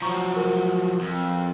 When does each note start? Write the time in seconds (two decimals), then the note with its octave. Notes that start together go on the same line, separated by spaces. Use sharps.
0.02 F3 F#3 A#5 C#6
0.36 A#4
1.01 F2